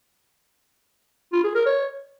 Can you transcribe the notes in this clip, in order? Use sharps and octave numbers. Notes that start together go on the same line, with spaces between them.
F4
G#4
A#4
C#5